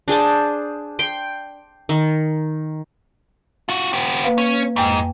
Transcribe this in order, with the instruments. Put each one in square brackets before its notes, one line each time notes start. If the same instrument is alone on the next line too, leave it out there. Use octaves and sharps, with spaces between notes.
[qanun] D4 G#4 C5 A5
G5 C6
D#3
[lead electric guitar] F4 F#4 [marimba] C#6
[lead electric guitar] B3 G4
[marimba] A#3 B4 F5
[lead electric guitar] C#4
[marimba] F2 G5 G#5 [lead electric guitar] G#2